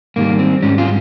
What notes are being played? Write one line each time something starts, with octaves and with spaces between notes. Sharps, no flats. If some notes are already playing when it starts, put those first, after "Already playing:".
G#2 D#3 G3 A#3
C4
G#2 G3 C#4
F4